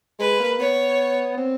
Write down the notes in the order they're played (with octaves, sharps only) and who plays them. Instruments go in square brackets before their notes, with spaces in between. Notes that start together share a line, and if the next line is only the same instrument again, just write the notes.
[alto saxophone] G#3 [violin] B4
[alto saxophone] A#3
[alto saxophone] B3 [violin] C#5
[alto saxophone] C4